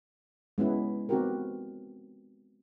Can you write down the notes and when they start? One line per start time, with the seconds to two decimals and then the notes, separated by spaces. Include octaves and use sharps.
0.58 G#3 B3 C#4 E4
1.09 B3 C4 D#4 F#4 G4 A#4